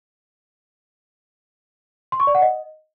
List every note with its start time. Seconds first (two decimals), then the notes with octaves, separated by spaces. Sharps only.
2.12 C6
2.20 C#6
2.27 D5
2.35 F#5
2.42 D#5